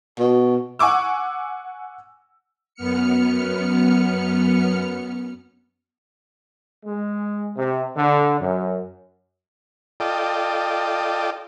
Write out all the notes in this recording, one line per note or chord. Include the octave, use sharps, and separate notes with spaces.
B2
F#5 G#5 C#6 D6 E6
F#2 B3 F6 C#7
G#3
C3
D3
F#2
F4 A4 D5 D#5 G5